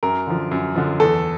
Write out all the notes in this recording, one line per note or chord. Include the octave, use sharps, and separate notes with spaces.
F#2 A#4
D3 F3
F#2
D3 F3
E2 A4